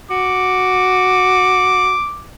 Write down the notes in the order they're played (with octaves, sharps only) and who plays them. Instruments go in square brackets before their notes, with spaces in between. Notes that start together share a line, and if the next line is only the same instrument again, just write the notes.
[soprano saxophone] F#4 [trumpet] D6